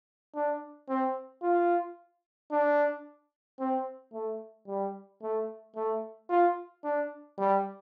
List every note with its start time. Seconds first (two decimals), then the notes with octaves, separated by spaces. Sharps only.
0.35 D4
0.89 C4
1.42 F4
2.51 D4
3.59 C4
4.13 A3
4.68 G3
5.22 A3
5.76 A3
6.30 F4
6.84 D4
7.38 G3